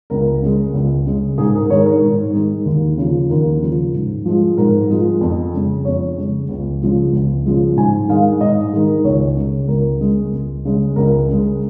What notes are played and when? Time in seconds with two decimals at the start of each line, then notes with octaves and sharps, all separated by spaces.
0.10 C#2 A#4
0.42 C#3 G#3
0.74 C#2
1.06 C#3 G#3
1.38 G#2 G#4
1.55 A#4
1.70 D#3 G#3 C#5
1.86 A#4
2.02 G#2
2.33 D#3 G#3
2.66 D#2
2.98 C#3 F3
3.30 D#2 A#4
3.61 C#3 F3
3.94 G#2
4.26 F3 G#3
4.57 G#2 A#4
4.90 F3 G#3
5.21 F2
5.54 C#3 G#3
5.85 F2 C#5
6.18 C#3 G#3
6.49 C#2
6.82 C#3 F3 G#3
7.13 C#2
7.46 C#3 F3 G#3
7.76 G#2 G#5
8.08 D#3 G#3 F5
8.41 G#2 D#5
8.73 D#3 G#3
9.04 C#2 C#5
9.37 C#3 G#3
9.68 C#2 A#4
10.00 C#3 G#3
10.32 C#2
10.65 C#3 G#3
10.96 C#2 A#4
11.29 C#3 G#3